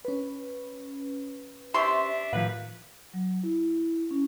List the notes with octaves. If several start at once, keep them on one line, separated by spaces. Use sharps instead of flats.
C#4 B4
C3 D4 G4 E5 C6
F#2 A2 D#3 F3 B4 F5
F#3
E4
C#4